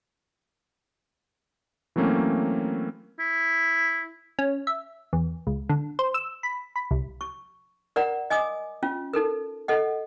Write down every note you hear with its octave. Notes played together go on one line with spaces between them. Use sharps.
E3 F#3 A3 A#3 C4 C#4
E4
C#4
E5
E2
C#2
D3
C5
E6
B5
B5
C2
C#6
A#4 D5 F#5 A#5
D#5 G#5 D6 D#6
C#4 F4
D#4 A4 A#4
A4 D#5 F#5